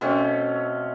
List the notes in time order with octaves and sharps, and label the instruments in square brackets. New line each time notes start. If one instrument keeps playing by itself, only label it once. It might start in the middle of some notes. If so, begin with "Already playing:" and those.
[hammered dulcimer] B2 A3 C4 C#4